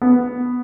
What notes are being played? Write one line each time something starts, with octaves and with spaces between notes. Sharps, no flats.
B3